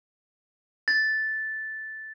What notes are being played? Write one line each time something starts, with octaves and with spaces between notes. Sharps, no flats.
A6